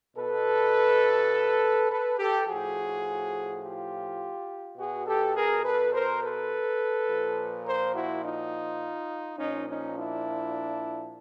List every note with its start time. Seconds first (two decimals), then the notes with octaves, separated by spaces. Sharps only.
0.16 B2 A4 B4
1.90 A4 B4
2.18 G4 A4
2.47 A2 F3 F#4 G#4
3.62 F4 G4
4.77 B2 F#4 G#4
5.06 G4 A4
5.35 G#4 A#4
5.64 A4 B4
5.93 A#4 C5
6.22 A4 B4
7.08 A#2 F3
7.66 A#4 C5
7.95 E4 F#4
8.23 D#4 F4
9.38 A#2 F3 C#4 D#4
9.68 C#4 D#4
9.97 D4 E4